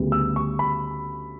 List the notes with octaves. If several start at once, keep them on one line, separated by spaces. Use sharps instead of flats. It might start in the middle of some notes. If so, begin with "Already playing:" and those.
Already playing: D2 C#3 G3 B3
E6
C#6
B5